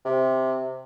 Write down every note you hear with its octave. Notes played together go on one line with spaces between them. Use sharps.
C3